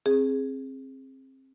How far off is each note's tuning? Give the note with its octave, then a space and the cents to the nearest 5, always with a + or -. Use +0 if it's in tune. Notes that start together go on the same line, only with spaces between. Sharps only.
C4 +25 G#4 +0